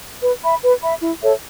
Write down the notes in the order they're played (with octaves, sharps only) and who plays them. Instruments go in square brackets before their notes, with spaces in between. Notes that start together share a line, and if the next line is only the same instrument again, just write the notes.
[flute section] B4
E5 B5
B4
E5 B5
E4
A4 C#5 E5